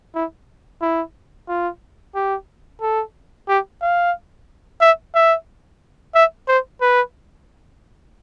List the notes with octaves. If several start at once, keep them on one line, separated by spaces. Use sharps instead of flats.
E4
E4
F4
G4
A4
G4
F5
E5
E5
E5
C5
B4